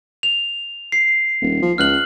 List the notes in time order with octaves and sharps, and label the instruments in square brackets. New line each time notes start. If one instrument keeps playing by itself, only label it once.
[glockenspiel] F7
C7
[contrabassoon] D#1
F3
[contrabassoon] C#2 [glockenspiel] F6 F#6 F#7